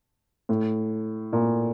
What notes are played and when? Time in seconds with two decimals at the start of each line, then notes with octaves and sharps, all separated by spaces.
0.49 A2
1.33 A#2